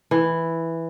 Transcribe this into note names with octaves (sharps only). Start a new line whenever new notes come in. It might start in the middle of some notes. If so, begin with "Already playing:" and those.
E3